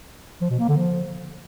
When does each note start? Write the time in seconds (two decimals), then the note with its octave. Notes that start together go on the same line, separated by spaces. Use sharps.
0.41 F3
0.50 B2
0.59 A#3
0.68 D3
0.77 F3